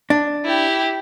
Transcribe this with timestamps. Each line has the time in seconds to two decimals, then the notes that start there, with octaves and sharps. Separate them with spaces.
0.10 D4
0.45 E4 G4